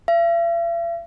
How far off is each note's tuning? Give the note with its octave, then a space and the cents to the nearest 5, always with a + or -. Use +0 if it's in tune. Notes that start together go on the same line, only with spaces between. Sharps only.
E5 +45